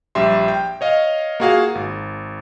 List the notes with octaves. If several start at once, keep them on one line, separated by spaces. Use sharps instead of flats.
A#1 G3 G4 E5 C6
G5
C#5 D#5 F5
A#3 F4 F#4 G#4 F5
G#1